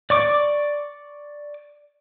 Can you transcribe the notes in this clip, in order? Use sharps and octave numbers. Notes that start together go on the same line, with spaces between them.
D5 C#6 D6